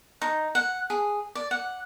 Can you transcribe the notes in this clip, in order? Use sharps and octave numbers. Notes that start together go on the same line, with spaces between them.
D#4
F#5
G#4
D5
F#5